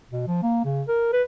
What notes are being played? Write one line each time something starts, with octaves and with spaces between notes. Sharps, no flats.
B2
F3
A#3
C#3
A#4
B4